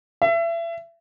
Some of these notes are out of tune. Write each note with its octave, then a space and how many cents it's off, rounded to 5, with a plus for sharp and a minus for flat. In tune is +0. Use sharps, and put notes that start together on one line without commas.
E5 +30